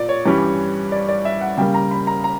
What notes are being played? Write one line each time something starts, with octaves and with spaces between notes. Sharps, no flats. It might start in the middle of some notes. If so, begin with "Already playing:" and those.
Already playing: A#2 D5
C#5
G2 E3 G3 C#4
D5
D5
E5
F#5
C#3 G3 A#3 G5
A#5
B5
A#5
A#5